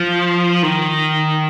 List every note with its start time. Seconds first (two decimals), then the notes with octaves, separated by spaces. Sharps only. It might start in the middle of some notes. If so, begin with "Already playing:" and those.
Already playing: F3
0.63 D#3